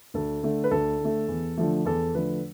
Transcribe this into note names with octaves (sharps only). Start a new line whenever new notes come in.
D2 A4
D3 A3
B4
D2 A4
D3 A3
E2
D3 F3 A3
E2 A4
D3 F3 A3 B4